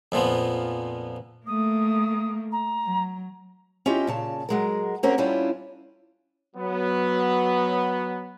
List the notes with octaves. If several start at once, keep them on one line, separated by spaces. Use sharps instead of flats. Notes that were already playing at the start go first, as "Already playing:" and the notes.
F2 A#2 F3 B3
A3 A#3 D#6
A#5
F#3
C#4 E4 F4 G4 D#5
A#2 C#3 A5
F#3 G#3 A#4
A#3 C4 C#4 F#4 A#4
G3 C#4 D4 E4 F4
F#3 B3